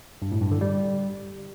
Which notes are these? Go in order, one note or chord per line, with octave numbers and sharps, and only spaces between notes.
G2
A2
G2
D3
G3